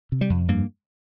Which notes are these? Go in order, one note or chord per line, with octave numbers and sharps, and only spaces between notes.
C3
G3
F2
G2 A#3